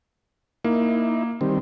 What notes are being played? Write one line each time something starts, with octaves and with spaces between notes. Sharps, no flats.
A#3 D#4 E4
D#3 G3 C4